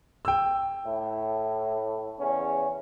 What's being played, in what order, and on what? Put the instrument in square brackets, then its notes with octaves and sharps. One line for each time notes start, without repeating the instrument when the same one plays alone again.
[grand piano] G5 E6
[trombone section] A2
E2 C#3 C#4